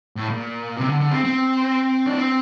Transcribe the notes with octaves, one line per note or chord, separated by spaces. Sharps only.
A2
A#2
C3
D3
D3
C4
C4
D4
C4